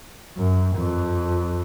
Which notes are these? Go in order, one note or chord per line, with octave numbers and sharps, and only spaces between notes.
F#2
F2